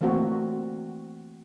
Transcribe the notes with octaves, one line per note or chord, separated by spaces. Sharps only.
E3 A3 A#3 C4 F#4